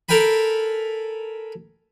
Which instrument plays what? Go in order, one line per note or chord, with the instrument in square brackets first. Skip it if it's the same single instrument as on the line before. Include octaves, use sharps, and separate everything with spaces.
[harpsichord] A4 A#4 G5 G#5 B5